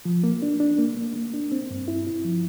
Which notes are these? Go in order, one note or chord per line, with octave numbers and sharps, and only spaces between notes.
F3
A#3
D4
D4
A#3
A#3
A#3
D4
C4
G2
E4
E4
F3